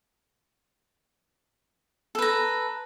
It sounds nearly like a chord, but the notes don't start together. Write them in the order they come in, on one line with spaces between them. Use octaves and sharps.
A4 B4 A#5